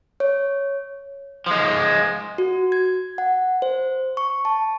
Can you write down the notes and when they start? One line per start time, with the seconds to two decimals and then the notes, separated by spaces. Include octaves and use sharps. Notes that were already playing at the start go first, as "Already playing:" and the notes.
0.20 C#5
1.46 F3 G#3
2.38 F#4
2.72 G#6
3.18 F#5
3.62 C5
4.17 C#6
4.45 A5